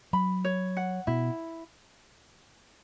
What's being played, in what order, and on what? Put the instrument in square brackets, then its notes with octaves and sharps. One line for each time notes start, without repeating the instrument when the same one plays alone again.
[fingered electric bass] F#3 [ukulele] B5
[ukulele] C#5
F#5
[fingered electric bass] B2 [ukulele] E4